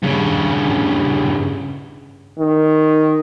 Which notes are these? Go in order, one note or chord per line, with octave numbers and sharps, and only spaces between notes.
G2 C#3
D#3